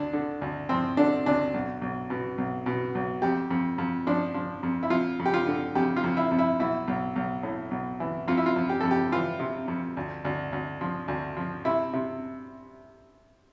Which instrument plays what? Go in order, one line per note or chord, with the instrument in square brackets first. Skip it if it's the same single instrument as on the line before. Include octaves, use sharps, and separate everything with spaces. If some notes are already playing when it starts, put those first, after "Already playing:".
Already playing: [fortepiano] D2 D4
D3
D2
F3 C4
D3 D4
D2 D4
B1
B1
B2
B1
B2
B1
F2 G4
F2
F2
F3 D4
F3
F2
E4
F2 F4
F2
G4
F4
D3
F2 G4
F4
F2
E4
F2
E4
B1 E4
B1
B1
A2
B1
E3
F2 F4
E4
F4
F2
G4
F2 A4
G4
E3 F4
C3
F2
D2
D2
D2
F3
D2
F3
C3 E4
C3